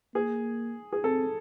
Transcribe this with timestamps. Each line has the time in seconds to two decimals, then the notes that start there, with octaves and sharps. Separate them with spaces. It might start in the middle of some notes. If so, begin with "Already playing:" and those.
0.15 A#3 G#4
0.93 G#4
1.04 C4 A4